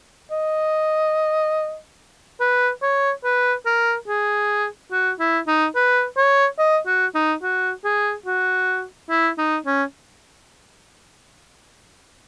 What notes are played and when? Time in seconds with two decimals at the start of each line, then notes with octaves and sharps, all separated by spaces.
0.31 D#5
2.40 B4
2.82 C#5
3.24 B4
3.66 A#4
4.08 G#4
4.92 F#4
5.19 E4
5.47 D#4
5.75 B4
6.17 C#5
6.59 D#5
6.87 F#4
7.15 D#4
7.43 F#4
7.84 G#4
8.26 F#4
9.10 E4
9.38 D#4
9.66 C#4